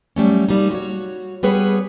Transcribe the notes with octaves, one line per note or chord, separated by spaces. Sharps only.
F#3 G3 A3 C#4
G3 A#3 D#4
F#4 C#5
G3 B3 G#4 B4 C#5